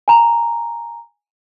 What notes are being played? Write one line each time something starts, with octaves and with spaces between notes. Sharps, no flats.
G#5 A#5